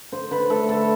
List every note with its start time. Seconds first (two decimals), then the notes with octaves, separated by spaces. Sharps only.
0.12 D3 C5
0.31 D3 B4
0.50 A3 A4
0.69 D3 A4